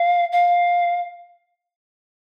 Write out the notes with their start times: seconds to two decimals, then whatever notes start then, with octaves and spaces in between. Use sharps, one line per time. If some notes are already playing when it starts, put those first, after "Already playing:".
Already playing: F5
0.32 F5